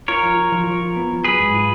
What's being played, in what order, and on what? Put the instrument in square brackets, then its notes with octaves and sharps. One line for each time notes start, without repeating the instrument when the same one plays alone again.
[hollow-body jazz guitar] F4 [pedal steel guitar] A#4 C#5
[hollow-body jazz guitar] F3
F4
F3
F3
F4
B3
F3
[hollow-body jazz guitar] F#3 [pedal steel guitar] G#4 B4
[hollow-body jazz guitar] G#2
F4